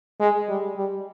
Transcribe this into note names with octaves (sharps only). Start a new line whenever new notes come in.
G#3
G3
G3